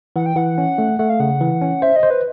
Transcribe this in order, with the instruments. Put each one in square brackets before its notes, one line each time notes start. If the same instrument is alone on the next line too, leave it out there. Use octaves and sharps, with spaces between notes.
[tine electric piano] E3 [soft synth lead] F#5
[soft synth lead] G5
[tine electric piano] E3 [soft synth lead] F#5
[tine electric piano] C#4
A3
[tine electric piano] A3 [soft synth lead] F#5
[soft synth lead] F5
[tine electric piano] C#3 [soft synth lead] F#5
[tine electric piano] E3
C#4
[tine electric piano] C5 [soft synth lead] E5
[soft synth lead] D#5
[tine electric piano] C5
[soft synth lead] B4